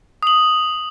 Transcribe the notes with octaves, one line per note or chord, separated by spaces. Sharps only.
D#6 F#7